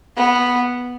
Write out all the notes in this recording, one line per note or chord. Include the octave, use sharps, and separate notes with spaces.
B3